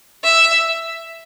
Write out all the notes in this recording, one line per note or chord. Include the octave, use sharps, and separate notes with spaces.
E5